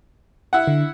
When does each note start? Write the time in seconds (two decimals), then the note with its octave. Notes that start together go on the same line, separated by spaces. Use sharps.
0.53 E4 F#5
0.67 D3